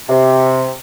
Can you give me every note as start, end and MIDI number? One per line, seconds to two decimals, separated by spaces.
0.09 0.72 48